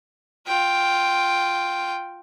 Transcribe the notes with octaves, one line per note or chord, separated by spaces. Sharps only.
F4 G5